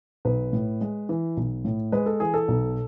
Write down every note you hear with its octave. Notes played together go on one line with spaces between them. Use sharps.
B1 B4
A2
G#3
E3
B1
A2
G#3 B4
A4
E3 G#4
A4
B1